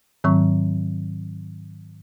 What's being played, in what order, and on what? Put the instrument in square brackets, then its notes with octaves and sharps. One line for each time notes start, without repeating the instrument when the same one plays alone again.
[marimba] G#2 D#3 F#3 C4 C#6